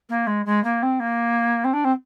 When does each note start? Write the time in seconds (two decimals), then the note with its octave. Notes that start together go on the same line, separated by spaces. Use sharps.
0.09 A#3
0.27 G#3
0.46 G#3
0.64 A#3
0.82 C4
1.00 A#3
1.64 C4
1.73 D4
1.84 C4